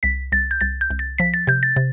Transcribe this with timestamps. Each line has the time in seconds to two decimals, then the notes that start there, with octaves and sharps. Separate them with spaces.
0.03 C2 B6
0.32 C2 A6
0.51 G6
0.61 C2 A6
0.81 G6
0.90 C2
0.99 A6
1.18 F3 B6
1.34 A6
1.47 C3 G6
1.63 A6
1.76 C3